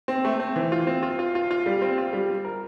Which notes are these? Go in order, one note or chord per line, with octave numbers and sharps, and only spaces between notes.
C4
A3
C4
E3
F4
C4
F4
F4
F4
F4
G3
C4
F4
G3
G3
A#4